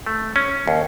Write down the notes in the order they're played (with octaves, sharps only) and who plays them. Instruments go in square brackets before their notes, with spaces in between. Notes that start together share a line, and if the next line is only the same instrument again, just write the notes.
[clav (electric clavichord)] A3
C#4
D#2